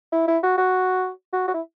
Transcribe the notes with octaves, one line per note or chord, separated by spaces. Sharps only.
E4
E4
F#4
F#4
F#4
F#4
E4